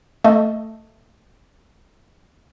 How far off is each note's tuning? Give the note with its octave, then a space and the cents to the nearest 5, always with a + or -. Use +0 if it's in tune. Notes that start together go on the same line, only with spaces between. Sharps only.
A3 +10 D#5 +5